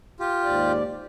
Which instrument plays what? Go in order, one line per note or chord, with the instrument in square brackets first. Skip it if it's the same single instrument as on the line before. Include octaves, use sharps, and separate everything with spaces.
[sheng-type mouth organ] F4 G4
[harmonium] D#2 G#2 D5